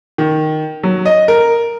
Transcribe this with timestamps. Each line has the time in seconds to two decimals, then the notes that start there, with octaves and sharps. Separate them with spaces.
0.18 D#3
0.83 F#3
1.05 D#5
1.28 A#4